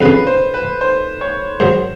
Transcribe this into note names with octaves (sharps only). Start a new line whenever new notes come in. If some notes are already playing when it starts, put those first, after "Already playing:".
F2 C#3 F3 B4
C5
B4
C5
C#5
G#2 D#3 F#3 C5